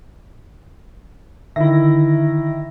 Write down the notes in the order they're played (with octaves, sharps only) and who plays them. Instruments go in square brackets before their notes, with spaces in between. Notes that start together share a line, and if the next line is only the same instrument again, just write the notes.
[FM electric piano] D3 E5 A#6 [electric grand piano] D#3 E4